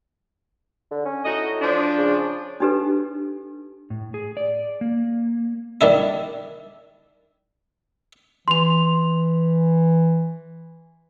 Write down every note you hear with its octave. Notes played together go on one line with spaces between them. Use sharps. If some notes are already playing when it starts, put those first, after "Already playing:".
D3
C#4
A2 D#4 F#4 D#5
F3 D4
C#3
D4 D#4 G4 A4 B4
A2
G#4
D5
A#3
D#3 G3 D4 E4
E3 C6 F7